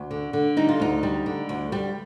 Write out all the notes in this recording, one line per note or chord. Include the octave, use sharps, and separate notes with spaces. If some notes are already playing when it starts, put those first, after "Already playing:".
Already playing: D2
D3
D3
G3 D#4
F4
D2 D#4
G3
D3
D2
G3